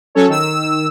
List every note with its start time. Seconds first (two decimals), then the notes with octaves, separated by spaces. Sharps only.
0.15 F#3 C#4 A4 C#5
0.28 D#3 E6